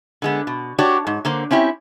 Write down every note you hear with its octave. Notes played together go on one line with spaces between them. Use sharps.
D3 G#3 B3
B2
D4 F#4 G4 C#5 D5
G#2
D3 A#3 C5
C4 C#4 E4 G4